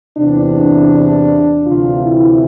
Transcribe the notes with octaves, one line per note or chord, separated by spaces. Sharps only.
E2 C3 E3 D4
D2 C3 E3 F4
E4